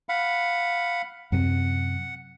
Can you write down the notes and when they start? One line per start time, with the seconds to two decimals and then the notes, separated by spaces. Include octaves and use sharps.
0.09 F5 F#5 B5
1.32 F#2 C3 F#5